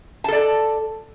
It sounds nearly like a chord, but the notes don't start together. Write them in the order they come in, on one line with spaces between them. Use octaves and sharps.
A5 A4 D5